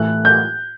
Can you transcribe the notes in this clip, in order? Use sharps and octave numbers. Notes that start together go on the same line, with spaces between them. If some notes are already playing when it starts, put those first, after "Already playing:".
Already playing: A2 E3 A3 F#6
G6